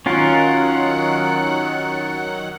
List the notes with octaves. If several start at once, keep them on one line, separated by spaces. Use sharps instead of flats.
D#3 F#3 C#4 F4 A#4 F#5